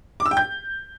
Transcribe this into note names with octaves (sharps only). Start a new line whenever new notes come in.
D6
E6
G5
G6